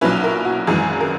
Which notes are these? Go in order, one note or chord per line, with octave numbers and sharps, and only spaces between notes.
B1 A#2 F#3 C#4 E4 B4
A#4
F#4
G#1 F#2 E3 G#3 G#4
A#4